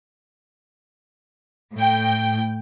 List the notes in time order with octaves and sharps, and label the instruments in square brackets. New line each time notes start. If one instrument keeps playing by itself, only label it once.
[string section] A2 G5